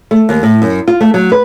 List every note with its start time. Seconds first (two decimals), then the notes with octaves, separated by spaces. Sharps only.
0.11 A3
0.29 D#2
0.43 A2
0.62 F#2
0.88 F4
1.01 A3
1.14 F#3
1.32 B4